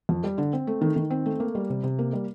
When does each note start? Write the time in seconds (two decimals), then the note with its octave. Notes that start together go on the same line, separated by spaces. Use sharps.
0.09 F2
0.24 G3
0.38 D3
0.53 C4
0.67 A3
0.81 D#3
0.96 D#3
1.10 C4
1.26 A3
1.40 A#3
1.55 G3
1.70 C3
1.84 C3
1.99 A#3
2.13 G3